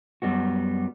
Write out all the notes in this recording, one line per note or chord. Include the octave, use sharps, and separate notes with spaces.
F#2 G3 B3 F#4